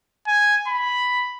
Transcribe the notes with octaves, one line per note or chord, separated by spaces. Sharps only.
G#5
B5